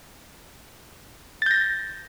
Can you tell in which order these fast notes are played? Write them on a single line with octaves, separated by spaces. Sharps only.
A6 G6 A#6